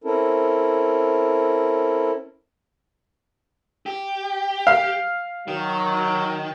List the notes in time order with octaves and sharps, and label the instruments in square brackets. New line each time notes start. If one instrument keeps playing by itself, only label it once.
[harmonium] C4 C#4 E4 A4 A#4
[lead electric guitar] G4
[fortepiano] F5
[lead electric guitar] D#3 [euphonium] F#3